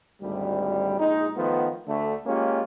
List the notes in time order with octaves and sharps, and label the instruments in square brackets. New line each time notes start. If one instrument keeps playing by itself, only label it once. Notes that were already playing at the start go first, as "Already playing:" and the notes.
[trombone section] G#1 D2 G3
A#1 G#3 D#4
D#3 F3 A3 B3
D2 D3 A3
G#3 A#3 C#4 F4 G4